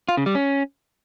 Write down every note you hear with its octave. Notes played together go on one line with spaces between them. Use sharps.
F4
C#3
G3
C#4